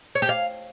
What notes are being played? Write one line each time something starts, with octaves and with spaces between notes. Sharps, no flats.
C#5
G4
F5